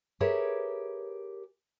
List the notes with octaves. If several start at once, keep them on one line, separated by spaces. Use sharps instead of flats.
G4 G#4 A#4 B4 C#5 E5